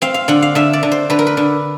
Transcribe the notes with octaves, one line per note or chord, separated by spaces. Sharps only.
C4 F5
F5
D3 F#5
F5
D3 E5
D5
D3
C5
D3 B4
A#4
B4
D3